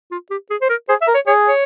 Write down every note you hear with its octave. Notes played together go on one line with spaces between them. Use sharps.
F4
G4
G#4
C5
A#4
G#4 C5
E5
A#4
C#5
G#4 C#5
C#5